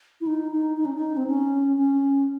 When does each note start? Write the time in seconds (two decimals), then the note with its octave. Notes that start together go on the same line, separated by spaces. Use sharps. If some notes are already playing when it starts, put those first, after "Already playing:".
0.21 E4
0.27 D#4
0.51 D#4
0.77 D#4
0.85 C#4
0.94 D#4
1.17 C4
1.27 C#4
1.77 C#4